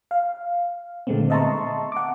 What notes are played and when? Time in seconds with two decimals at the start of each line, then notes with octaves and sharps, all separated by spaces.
0.11 F5
1.07 A#2 D3 G#3 A3 B3 C4
1.30 D#5 E5 A5 A#5 C6 C#6
1.92 F#5 D6